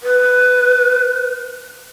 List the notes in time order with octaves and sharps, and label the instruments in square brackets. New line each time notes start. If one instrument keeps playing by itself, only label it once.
[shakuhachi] B4